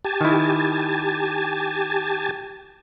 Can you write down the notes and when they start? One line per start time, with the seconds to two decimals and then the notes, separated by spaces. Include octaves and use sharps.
0.05 G4 G#5 A5
0.21 D#3 E4